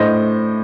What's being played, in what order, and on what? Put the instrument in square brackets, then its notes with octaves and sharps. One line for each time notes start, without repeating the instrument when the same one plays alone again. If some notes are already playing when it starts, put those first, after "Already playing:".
Already playing: [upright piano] A2 D4 C5 D#5